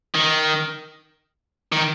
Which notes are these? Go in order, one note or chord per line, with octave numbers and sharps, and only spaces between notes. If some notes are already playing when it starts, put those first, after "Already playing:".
D#3
D#3